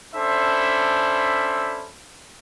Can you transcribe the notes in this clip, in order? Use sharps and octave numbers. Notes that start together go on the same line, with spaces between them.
C#4 D4 A4 C5 E5 B5